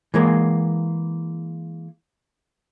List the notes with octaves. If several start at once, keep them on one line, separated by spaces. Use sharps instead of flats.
E3 G#3 A#3